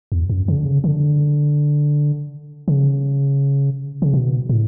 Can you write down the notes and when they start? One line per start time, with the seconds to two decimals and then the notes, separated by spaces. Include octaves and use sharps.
0.12 E2
0.30 F#2
0.48 C#3
0.57 D3
0.65 C#3
0.84 D3
2.68 C#3
4.02 C#3
4.14 B2
4.49 A2